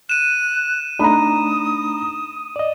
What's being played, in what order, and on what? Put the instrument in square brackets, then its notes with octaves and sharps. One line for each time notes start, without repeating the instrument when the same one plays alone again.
[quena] F#6 [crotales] D#7 E7
[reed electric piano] A3 D4 D#4 [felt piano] A#5 B5 [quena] D#6
[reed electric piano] D5 D#5